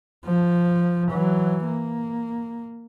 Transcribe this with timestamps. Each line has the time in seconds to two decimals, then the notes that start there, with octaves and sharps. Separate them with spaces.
0.25 F3
1.12 E3 F#3
1.65 A#3